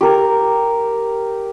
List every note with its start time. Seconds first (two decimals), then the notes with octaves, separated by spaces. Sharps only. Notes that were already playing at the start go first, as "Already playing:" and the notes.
0.01 G4 A#4